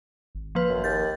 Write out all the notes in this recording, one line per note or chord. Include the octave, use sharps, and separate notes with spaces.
G#1
F3 A#3 B4
F#2
D#2 G6 A6